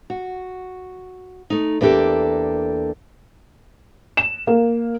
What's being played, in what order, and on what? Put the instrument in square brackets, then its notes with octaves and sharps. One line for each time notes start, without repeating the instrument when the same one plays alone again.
[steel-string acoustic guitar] F#4
A3 D#4
E2 A#3 D4 G4 A4
[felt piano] E7
A#3